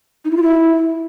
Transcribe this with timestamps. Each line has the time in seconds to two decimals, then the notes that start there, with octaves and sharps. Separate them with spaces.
0.25 D#4
0.31 E4
0.37 F4
0.43 E4